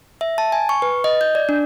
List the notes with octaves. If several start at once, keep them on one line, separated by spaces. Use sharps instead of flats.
E5
A5
G#5
C#6
B4
D#5
G6
D5
D4